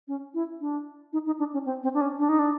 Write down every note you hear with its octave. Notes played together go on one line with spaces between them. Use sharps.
C#4
E4
D4
D#4
D#4
D4
C#4
C4
C4
D4
C#4
D4
D#4
D4